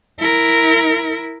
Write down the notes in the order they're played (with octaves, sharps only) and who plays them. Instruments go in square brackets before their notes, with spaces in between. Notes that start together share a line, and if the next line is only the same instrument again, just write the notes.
[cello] E4 A#4